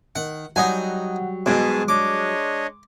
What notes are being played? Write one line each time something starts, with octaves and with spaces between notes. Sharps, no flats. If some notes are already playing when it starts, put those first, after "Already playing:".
D#3 F#5
F#3 G3 D#4 F#5 G#5
G#2 B2 G#3 G#4 G#5 A5
D4 C#5 D#5 D6